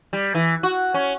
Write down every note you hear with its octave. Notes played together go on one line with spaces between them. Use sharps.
G3
E3
F#4
C#4